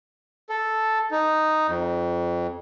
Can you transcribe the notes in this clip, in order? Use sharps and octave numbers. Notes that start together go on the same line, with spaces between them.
A4
D#4
F2